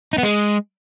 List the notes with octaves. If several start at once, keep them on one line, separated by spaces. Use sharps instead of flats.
D#4
B3
G#3